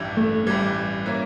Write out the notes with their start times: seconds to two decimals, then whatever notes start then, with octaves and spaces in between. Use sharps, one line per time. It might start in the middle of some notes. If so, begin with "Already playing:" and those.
Already playing: A1 G2 E3
0.17 A3
0.47 A1 G2 E3 G3
1.06 E3 A#3 C#4 E4